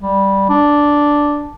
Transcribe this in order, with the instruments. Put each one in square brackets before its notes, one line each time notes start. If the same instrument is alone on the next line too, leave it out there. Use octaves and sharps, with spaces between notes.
[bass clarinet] G3
D4